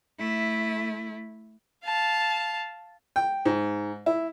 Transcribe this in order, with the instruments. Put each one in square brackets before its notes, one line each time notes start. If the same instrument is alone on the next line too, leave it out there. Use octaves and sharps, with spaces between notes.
[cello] A3 E4
[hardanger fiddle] F5 A5
[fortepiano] G5
G#2
E4